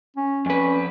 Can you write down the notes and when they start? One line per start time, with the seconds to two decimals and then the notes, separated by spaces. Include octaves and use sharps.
0.17 C#4
0.46 F2 C#4 B4